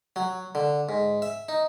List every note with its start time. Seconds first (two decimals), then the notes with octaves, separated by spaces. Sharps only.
0.16 F#3
0.55 D3
0.89 G#2
1.22 E5
1.49 D#4